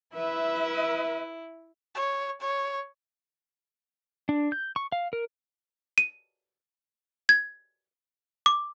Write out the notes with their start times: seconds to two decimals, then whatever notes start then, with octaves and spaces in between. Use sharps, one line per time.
0.15 E4 B4 E5
1.95 C#5
2.41 C#5
4.29 D4
4.52 G6
4.76 C#6
4.92 F5
5.13 A#4
5.98 D#7
7.29 G#6
8.46 D6